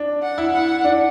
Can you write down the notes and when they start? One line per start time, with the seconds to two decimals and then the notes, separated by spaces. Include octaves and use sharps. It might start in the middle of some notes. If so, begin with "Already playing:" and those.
Already playing: D4
0.22 F#5
0.38 E4
0.53 F#5
0.85 D4